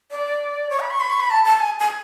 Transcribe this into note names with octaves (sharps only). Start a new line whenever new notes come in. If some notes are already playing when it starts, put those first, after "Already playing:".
D5
C#5
B5
C#6
B5
C#6
B5
A5
A5
G#5
G#5